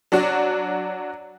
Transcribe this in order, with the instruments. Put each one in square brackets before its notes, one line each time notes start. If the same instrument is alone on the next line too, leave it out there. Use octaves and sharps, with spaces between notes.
[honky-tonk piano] F#3 D4 F#4